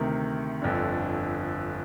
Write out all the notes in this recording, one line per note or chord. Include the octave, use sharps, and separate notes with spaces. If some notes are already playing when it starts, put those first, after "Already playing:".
Already playing: D2 C3 D#3
G1 F2 D3